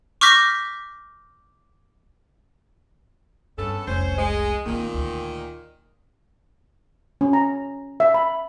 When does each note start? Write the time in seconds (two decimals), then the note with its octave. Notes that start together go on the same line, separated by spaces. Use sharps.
0.21 C#6 D6 F6 G6 A#6 B6
3.58 G2 B3 C#4 A4
3.87 F1 C2 C#4 C5
4.18 G#3
4.66 A#2 D#3 A#3 C4
4.94 D2
7.21 C#4
7.33 A#5
8.00 E5
8.14 B5